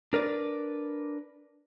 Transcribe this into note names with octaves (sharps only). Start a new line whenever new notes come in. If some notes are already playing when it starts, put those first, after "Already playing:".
D4 A#4 B4 D5